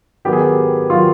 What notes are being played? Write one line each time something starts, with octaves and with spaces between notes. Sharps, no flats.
D#3 F#3 B3 G4
G#4
G4
D#3 F#3 B3 F4